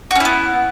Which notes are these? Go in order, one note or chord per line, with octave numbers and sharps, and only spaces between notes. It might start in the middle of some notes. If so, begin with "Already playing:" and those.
B3 C#4 E4 F#4